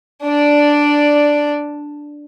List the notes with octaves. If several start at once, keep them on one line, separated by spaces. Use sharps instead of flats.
D4 D5